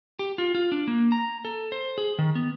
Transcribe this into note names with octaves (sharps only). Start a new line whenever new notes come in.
G4
F4
F4
D4
A#3
A#5
A4
C5
G#4
D#3
B3